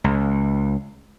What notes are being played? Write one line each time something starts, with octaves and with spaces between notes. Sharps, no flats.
C#2